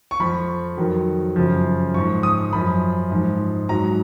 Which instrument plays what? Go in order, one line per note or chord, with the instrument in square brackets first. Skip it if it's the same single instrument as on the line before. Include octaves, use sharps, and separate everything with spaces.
[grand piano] C#6
F2 F3 B5
F2 D#3 F#3
F#2 C#3 F3
F3 C#6
G#2
D#6
F#2 F3 B5
G#2 F3
G#2 F#3 A#5